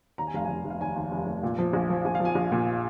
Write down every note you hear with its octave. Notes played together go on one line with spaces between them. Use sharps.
D#2 A#5
G#5
F1 F5
F1 G#5
F1
F5
D#2 G#5
D#2
F1
F1
A#2
F3
A#1
F3
A#1 G#5
F5
F3
G#5
A#1
A#2